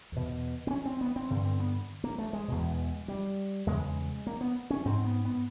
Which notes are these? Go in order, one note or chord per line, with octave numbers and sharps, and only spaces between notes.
E2 B2
C4
C#4
C4
B3
C4
G2 D3
C4
B3
A#3
A3
G#3
E2 B2
G3
E2 C#3 G#3
A#3
B3
C#4
G#2 C4
B3
B3